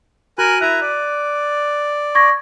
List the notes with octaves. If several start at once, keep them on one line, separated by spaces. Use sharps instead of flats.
F#4 A#4 G#5 F#6
E4 E5 A#5 F#6 D#7
D5
C#6 G#6 A#6